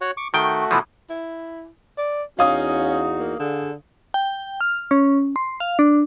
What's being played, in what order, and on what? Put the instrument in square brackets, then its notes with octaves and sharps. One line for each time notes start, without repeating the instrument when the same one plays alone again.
[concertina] F#4 C#5 F#5
C#6 D6
[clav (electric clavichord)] D#3 G5 [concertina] A3 F#4
[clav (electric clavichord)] B2 E3 F3
[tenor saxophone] E4
D5
[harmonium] E2 D#4 F#4 [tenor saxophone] C#4 [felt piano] F5 D#6
[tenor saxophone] A#3
[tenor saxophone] D3 [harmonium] D4 G#4
[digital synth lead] G5
F6
C#4
C6
F5
D4